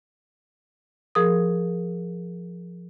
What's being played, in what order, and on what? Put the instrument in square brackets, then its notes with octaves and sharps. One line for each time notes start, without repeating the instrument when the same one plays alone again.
[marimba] F3 G#4 A#4 D#6